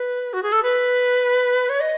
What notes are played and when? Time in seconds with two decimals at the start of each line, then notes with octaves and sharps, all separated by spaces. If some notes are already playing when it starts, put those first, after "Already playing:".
Already playing: B4
0.33 F#4
0.43 G#4
0.52 A4
0.63 B4
1.69 C#5
1.80 D#5